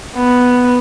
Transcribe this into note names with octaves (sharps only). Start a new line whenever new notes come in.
B3